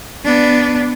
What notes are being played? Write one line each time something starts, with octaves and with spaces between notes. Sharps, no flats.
B3 D4